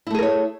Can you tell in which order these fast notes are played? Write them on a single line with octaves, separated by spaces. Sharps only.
E4 A3 G#4 A#4 C#5